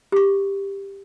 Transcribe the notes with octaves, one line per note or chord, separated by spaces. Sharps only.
G4 C#6